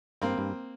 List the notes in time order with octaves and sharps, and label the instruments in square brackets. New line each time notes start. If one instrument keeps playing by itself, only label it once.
[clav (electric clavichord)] G2 [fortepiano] A#3 C4
[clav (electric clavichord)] G2